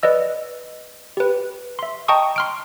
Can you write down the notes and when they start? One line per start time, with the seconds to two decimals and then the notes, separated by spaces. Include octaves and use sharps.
0.03 B4 D5 D#5 E6
1.17 G4 B4
1.79 E5 C6
2.08 D#5 G5 A5 A#5 C#6 D#6
2.36 C6 F6 D7